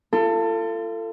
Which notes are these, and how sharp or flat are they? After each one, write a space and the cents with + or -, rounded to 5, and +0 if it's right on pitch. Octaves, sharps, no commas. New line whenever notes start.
F4 -35 A4 +25